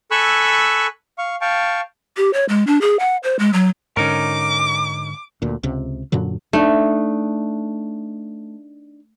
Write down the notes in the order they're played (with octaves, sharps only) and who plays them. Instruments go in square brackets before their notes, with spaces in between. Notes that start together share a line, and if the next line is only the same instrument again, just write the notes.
[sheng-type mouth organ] A4 G#5 B5 C#6 E6 F#6
F5 C#6
F5 G5 A5 C#6
[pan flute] G4
C#5
G#3
D4
G#4
F#5
C5
G#3
F#3
[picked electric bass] G#2 D3 [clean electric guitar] C#4 D#4 A#4 [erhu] D6
[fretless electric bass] D2 A#2
C#2 C3
F#2 A#2 D3 F#3
[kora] A3 [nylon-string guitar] D4 D#4